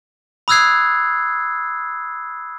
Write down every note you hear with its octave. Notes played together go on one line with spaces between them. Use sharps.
B5 D#6 E6 F#6 G#6 C7